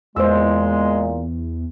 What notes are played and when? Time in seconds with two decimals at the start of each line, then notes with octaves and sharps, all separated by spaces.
0.16 E2 A#2 G#3 C5 E6